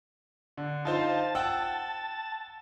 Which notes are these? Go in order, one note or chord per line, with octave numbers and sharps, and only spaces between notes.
D3
D#4 F4 C5 A5
F#5 G5 E6